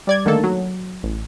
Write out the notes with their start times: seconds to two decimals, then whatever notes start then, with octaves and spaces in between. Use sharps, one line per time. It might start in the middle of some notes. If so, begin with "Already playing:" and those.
0.07 G3 D5 G#6
0.25 D3 D#3 A3 A#3 A4
0.43 F#3
1.03 A1